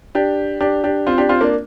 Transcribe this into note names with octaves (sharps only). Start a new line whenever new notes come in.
D4 G4
D4 G4
D4 G4
C4 F4
D4 G4
C4 F4
A#3 D4